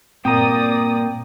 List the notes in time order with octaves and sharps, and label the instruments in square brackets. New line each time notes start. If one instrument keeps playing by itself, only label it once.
[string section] G2 D5 D#6 [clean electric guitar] A#2 A#3 [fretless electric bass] C4 [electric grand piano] G5 A#5